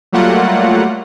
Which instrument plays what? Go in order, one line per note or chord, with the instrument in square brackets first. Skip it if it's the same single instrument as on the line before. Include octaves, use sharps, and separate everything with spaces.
[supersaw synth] F#3 G3 A3 A#3 F4 F#5